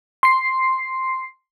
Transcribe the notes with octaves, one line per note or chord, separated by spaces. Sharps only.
C6 C7